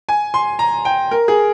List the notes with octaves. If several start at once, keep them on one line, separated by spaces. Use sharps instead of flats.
G#5
C6
A#5
G5
A#4
G#4